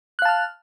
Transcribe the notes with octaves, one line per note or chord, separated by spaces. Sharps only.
F5 A5 F6 F#6